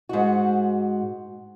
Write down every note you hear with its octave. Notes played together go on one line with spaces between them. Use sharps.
G#2 F#4